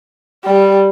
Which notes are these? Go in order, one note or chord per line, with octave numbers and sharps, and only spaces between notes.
G3